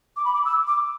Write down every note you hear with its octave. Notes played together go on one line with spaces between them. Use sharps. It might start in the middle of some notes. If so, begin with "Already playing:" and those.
D6
B5
D6
E6
D6